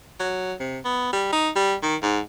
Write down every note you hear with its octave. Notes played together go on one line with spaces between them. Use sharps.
F#3
C3
B3
G3
D#4
G3
D#3
G#2